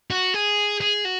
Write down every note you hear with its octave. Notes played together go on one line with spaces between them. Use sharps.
F#4
G#4
G#4
F#4